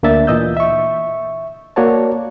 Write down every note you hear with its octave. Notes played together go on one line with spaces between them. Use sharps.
D2 A#3 D4 E5 A6
A#2 E3 D#5 E6 G6
E5 C#6
A#3 F#4 C#5 D5 A5